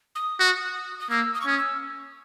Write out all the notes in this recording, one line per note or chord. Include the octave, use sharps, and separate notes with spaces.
D#6
F#4
D#6
A#3 E6
D#6
C#6
C#4 D#6
E6